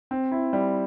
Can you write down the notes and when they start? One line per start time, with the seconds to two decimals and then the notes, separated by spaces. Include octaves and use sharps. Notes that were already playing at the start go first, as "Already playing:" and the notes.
0.11 C4
0.31 E4
0.53 G3